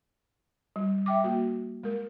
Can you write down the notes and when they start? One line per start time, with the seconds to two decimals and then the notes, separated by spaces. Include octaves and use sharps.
0.76 G3
1.06 E5 G5 D6
1.24 A#3 F#4
1.83 G#3 A#4